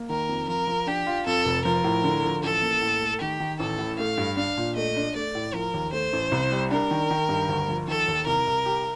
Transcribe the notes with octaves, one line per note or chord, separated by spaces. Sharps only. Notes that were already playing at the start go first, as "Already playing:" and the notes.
Already playing: A#3
D#3 A#4
F2
F3 A#4
F3
D4 G4
F4
F2 A4
F1
F3 A#4
A2
D3
F3
A1 A4
A#3
A2
A3
D#3 G4
D#3
A1 A4
A2
A3 F5
G2
D4 F5
A#2
A3 D#5
D4
A3 D5
A2
F3 A#4
D#2
A3 C5
A1
C2
G3
D4 A#4
D#3
D#3
G2
D2
F3
D#3 A4
D#2
C2 A#4
C2
G4